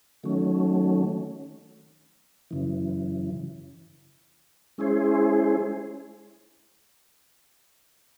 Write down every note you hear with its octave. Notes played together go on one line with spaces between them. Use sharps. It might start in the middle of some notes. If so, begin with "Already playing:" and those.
D#3 F#3 A3 C#4
F#2 C#3 E3
G#3 C#4 E4 G#4 C5